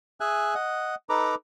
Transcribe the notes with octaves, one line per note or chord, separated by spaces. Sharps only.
G#4 E5 G#5 F#6
D#5 F#5
D#4 A4 B4 A#5 D6